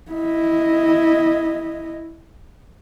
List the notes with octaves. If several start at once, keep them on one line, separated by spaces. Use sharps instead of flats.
E4 D#5